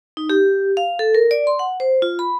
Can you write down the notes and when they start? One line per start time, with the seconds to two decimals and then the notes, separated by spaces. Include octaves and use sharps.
0.17 D#4
0.30 G4
0.77 F5
0.99 A4
1.15 A#4
1.31 D5
1.47 C6
1.59 F#5
1.80 C5
2.02 F4
2.19 B5